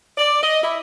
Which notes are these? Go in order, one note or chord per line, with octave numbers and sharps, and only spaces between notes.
D5
D#5
E4